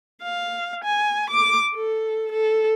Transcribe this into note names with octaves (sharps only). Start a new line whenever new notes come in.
F5
G#5
D6
A4
A4